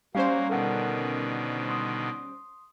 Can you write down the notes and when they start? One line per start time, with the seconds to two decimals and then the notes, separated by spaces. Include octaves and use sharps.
0.15 F#3 G3 A#3 C#4 C5 F5
0.50 B2 D3 D#3 A4 A#4 F#5
1.69 C6 D#6